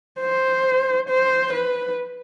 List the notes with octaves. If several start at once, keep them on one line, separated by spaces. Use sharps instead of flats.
C5
C5
B4